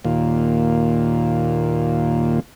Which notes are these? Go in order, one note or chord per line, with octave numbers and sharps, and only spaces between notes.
D#2 A#2